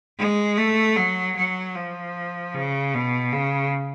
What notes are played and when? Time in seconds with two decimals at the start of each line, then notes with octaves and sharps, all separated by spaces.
0.19 G#3
0.57 A3
0.97 F#3
1.36 F#3
1.75 F3
2.54 C#3
2.94 B2
3.33 C#3